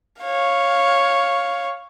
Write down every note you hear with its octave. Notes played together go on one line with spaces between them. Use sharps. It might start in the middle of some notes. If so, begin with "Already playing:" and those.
C#5 F5